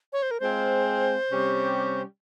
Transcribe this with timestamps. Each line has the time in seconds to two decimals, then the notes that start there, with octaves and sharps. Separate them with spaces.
0.13 C#5
0.22 C5
0.31 A#4
0.40 G#3 C4 F4 C5
1.31 C3 G3 C#4 G4